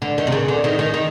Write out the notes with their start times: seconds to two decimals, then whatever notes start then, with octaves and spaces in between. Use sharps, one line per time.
0.02 D3
0.18 D#3
0.27 C3
0.32 C#3
0.48 D3
0.64 D#3
0.79 D#3
0.94 D#3